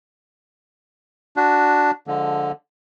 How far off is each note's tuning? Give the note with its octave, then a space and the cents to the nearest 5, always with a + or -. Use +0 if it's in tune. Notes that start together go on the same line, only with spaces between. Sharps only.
D4 +0 F#4 +0
D3 +0 F3 +20 G#3 +0